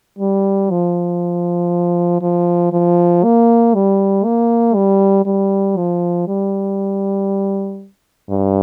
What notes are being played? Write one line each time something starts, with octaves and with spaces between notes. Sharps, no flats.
G3
F3
F3
F3
A#3
G3
A#3
G3
G3
F3
G3
G2